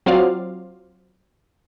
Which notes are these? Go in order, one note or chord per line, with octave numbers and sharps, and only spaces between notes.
F#3 C4 F4 F#4 D5 F5